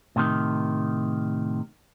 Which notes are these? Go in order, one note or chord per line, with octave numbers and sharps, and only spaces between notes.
A2 C3 D#3